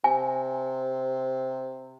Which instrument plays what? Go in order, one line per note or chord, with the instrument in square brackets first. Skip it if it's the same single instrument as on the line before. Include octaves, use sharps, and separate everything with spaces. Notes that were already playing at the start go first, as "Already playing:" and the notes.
[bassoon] C3 [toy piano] G#5